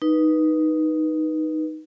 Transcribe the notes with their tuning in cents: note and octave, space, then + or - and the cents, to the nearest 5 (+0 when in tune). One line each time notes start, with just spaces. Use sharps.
D#4 +0 B4 -15